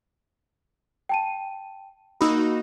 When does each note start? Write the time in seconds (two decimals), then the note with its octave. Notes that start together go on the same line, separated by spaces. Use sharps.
1.09 G5 A5 D#7
2.21 A#3 D#4 F#4 B5 D#6 E6